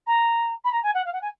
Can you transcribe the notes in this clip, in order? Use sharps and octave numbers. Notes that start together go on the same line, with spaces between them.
A#5
B5
A#5
G#5
F#5
F5
F#5
G#5